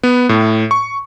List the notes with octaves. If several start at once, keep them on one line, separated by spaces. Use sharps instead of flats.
B3
A2
C#6